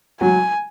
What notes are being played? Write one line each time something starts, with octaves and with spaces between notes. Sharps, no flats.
F#3 G#5